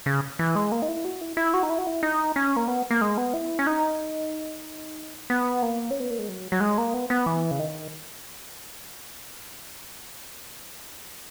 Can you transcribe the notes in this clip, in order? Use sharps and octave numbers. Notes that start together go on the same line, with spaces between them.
C#3
E3
G#3
A#3
D#4
E4
F#4
E4
E4
F#4
D#4
E4
F#4
E4
D#4
C#4
A#3
B3
A#3
G#3
B3
E4
C#4
D#4
B3
A#3
C#4
B3
A#3
G#3
F#3
F#3
G#3
A#3
B3
B3
E3
C#3
D#3